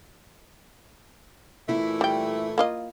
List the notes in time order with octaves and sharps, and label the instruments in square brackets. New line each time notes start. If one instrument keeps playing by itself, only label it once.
[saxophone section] A#2 E3 A3 [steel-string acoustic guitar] E4
[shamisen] G3 G5
A#3 F4 D#5